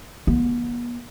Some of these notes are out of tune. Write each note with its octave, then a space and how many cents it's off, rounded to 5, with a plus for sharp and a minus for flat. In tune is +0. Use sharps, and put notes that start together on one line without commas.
B3 -45